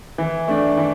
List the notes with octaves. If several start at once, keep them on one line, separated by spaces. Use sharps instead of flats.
E3
A3 D4
E3